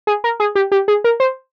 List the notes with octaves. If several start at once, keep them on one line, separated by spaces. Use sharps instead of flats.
G#4
A#4
G#4
G4
G4
G#4
A#4
C5